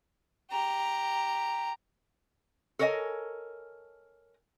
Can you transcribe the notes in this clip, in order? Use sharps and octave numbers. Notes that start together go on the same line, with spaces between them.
G4 A#5
A4 A#4 C#5 D#5 G#5